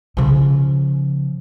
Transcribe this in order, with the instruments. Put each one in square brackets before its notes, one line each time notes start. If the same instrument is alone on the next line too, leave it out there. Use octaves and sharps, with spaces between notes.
[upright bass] C#3 F3